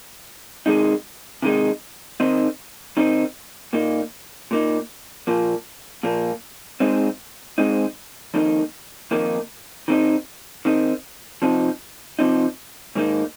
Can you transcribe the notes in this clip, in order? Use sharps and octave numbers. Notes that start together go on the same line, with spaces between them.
C3 D#3 G#3 D#4
C3 D#3 G#3 D#4
D#3 C4 D#4
D#3 C4 D#4
A#2 A#3 D#4
A#2 A#3 D#4
A#2 F3 A#3
A#2 F3 A#3
G#2 G#3 C4 D#4
G#2 G#3 C4 D#4
F2 D#3 A#3 D#4
F2 D#3 A#3 D#4
D#3 C4 D#4
D#3 C4 D#4
C3 F3 C4 D#4
C3 F3 C4 D#4
G#2 D#3 A#3 D#4